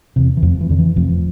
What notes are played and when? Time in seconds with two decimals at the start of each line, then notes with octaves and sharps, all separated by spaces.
0.16 E2 C3
0.37 E3
0.42 F1 F2 F3
0.61 E3
0.69 F2 D3
0.79 E3
0.96 F1 F2 F3